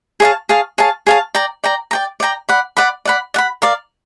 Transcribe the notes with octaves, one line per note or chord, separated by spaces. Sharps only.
G#4 C#5 F5 A5
G#4 C#5 F5 A5
G#4 C#5 F5 A5
G#4 C#5 F5 A5
D5 G5 A#5
D5 G5 A#5
D5 G5 A#5
D5 G5 A#5
D5 F#5 B5
D5 F#5 B5
D5 F#5 B5
D5 F#5 B5
A#4 D5 F5